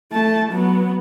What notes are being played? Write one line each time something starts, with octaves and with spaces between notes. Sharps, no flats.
A3 A5
F#3 B3